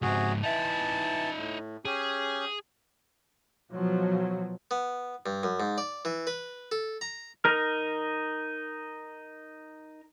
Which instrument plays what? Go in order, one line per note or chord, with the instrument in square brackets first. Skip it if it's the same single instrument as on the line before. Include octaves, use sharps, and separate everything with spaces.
[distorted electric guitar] C#2 G#2 [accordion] C3 F#4 G#4
[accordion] E3 A5 [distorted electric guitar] D#4 E5
[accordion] A2
[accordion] C#4 G4 [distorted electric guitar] G#4
[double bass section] B2 F3 F#3
[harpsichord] B3
G2
F#2
G#2
D5
E3
B4
A4
A#5
[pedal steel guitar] D#4 A#4 F6